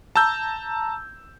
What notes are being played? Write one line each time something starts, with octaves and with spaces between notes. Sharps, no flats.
A5 A#5 E6 G6